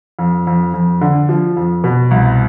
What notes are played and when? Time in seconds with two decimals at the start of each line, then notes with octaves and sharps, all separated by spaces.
0.19 F2
0.47 F2
0.74 F2
1.01 D3
1.29 F3
1.57 F2
1.84 B2
2.11 C2